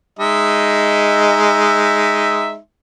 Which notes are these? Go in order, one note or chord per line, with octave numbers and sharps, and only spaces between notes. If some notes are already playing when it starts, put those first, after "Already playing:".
G#3 D#4 E5